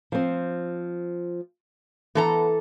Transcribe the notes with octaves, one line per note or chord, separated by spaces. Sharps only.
F3 C4
E3 B3 A4 A#5